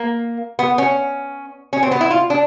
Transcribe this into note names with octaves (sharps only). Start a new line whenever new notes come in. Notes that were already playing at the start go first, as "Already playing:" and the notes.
Already playing: A#3
B3
C#4
C#4
C4
B3
E4
F4
D4